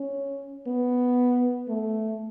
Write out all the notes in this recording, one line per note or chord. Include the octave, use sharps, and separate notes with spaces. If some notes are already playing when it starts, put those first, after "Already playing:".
Already playing: C#4
B3
A3